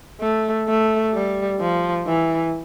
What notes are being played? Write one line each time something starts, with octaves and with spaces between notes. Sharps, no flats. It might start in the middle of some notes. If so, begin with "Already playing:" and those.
A3
A3
G3
F3
E3